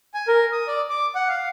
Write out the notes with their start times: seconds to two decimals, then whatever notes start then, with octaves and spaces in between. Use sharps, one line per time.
0.14 G#5
0.28 A#4
0.52 D#6
0.68 D5
0.90 D6
1.15 F#5
1.28 F5